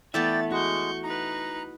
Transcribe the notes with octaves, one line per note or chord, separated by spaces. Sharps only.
E3 A3 B3 D5 E5 G5 A6
G#3 F#4 C#6 G6
D#4 B4 A#5